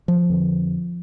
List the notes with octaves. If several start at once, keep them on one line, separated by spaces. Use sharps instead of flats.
F3
F2 D3